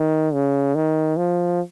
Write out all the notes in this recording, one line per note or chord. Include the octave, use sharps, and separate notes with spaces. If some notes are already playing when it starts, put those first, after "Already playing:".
Already playing: D#3
C#3
D#3
F3